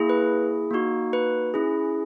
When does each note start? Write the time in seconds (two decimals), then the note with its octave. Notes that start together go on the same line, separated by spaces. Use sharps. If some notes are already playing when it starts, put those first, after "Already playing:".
Already playing: A#3 E4 G#4
0.09 B4
0.71 A#3 D#4 F#4
1.13 B4
1.54 C#4 E4 G#4